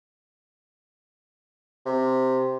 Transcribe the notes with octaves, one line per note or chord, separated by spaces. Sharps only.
C3